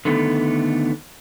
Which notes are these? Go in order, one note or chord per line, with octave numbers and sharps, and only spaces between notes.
D3 D#3 A3 B3